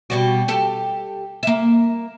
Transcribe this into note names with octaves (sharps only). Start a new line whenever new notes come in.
B2 G3 F#4
G4 A4
A#3 E5